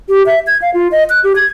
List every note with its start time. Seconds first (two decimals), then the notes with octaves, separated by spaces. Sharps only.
0.09 G4
0.26 E5
0.47 G#6
0.62 F5
0.74 F4
0.92 D#5
1.10 F#6
1.24 G4
1.36 G#6